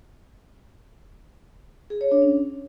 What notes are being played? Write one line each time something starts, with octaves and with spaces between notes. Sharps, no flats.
G#4
C#5
D4
C#4